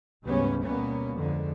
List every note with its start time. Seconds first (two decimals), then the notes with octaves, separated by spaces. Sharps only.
0.24 D2 G#2 C#3 G3 B3 C#4
0.63 B2 G3 A#3 B3 C#4
1.14 F2 D3 G#3